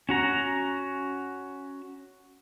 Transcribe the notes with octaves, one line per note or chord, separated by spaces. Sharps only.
C#4 F#4 A#5